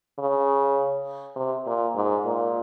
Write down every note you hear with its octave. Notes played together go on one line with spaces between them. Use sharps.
C#3
C3
A#2
G#2
A#2